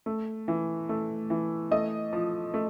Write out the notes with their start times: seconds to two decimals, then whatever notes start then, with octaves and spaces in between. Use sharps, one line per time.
0.06 A3
0.48 E3
0.89 A3
1.30 E3
1.71 A3 D#5
2.13 F3
2.54 A3